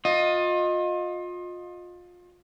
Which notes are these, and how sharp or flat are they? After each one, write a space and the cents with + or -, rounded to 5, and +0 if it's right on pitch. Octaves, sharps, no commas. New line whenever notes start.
F4 +30 D#5 +0